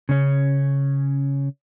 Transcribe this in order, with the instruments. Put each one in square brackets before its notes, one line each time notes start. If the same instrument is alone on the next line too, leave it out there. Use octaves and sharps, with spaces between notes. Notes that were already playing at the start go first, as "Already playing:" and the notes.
[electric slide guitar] C#3 C#4